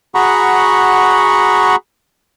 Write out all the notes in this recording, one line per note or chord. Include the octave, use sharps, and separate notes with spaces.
F#4 G#4 F#5 A#5 B5 C#6